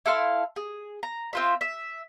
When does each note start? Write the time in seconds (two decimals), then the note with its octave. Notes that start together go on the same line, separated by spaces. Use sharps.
0.06 E4 A4 F5 C6
0.56 G#4
1.03 A#5
1.33 C4 F4 E5
1.61 E5